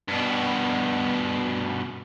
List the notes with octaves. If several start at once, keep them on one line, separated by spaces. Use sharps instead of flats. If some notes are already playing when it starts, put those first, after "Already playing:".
G2 B2